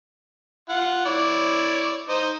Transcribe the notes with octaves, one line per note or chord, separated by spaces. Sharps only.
F4 F#5
E4 C#5 D5
D#4 C5 D#5